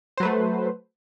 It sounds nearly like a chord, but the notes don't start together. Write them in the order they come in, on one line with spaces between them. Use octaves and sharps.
C5 F#3 B4 A3